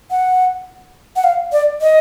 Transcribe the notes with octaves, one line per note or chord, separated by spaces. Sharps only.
F#5
F#5
F5
D5
D#5